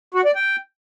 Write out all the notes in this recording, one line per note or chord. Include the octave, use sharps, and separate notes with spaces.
F#4
D5
G5